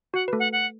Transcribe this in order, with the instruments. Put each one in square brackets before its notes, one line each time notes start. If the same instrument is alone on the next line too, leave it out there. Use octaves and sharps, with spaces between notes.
[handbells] F#4 [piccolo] F#5
[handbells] B4
A3 A4
[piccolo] F#5
F#5